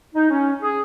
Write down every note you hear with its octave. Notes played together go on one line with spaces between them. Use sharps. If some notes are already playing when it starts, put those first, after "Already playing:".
D#4
C#4
G#4